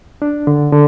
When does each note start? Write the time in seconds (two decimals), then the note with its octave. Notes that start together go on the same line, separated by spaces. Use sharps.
0.22 D4
0.47 D3
0.72 D3